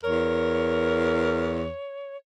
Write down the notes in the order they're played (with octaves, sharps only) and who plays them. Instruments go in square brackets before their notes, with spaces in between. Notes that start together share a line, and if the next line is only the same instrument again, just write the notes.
[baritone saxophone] E2 [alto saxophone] A#4 [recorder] C#5